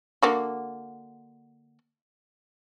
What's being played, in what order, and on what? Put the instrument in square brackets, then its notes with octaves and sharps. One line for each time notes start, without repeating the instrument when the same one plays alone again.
[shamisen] D3 A#3 F#4